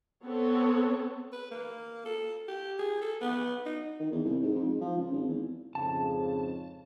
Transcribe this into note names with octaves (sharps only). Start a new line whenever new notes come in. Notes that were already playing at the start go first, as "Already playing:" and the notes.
B3 C4 A4 C#5
B4
A#3
A4
G4
G#4
A4
B3
D#4
D#3
E2
C2
G#2
F2
G#2
F3
C#2
G#1
E2
F2 G#2 C#3 A5